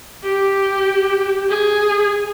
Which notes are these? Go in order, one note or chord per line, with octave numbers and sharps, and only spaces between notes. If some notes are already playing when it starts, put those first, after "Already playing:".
G4
G#4